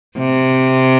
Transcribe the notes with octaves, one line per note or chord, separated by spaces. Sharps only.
C3